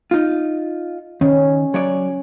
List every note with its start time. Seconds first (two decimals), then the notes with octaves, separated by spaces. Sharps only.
0.11 D#4 F4
1.21 D#3 C#4
1.74 F#3 C#5 D5